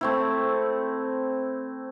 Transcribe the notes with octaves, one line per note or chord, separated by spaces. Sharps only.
A3 C4 E4